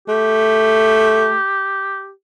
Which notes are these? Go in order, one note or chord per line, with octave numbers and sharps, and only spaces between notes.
A3 G4